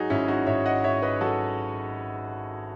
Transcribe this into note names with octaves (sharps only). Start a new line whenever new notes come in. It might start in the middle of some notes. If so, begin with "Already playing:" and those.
Already playing: G#2 F#3 D#4 F#4 G#4
G#1 C#4 E4
D#4 F#4
G#1 C#5 E5
D#5 F#5
G#2 C#5 E5
B4 D#5
F#3 F#4 A4